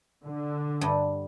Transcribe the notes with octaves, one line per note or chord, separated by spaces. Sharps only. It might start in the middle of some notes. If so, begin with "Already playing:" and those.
D3
G2